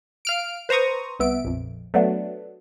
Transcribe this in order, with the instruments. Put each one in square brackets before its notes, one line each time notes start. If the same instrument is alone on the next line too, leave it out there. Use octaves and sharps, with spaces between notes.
[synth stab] F5 F6 D7
B4 C5 A#5 C#6 D#6
C2 B3 E5 D7
A#1 F2
F#3 A3 B3 D4 F#4